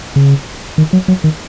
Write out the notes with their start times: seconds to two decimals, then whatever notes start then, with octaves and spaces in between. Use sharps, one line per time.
0.16 C#3
0.78 D#3
0.93 F#3
1.08 F#3
1.24 D#3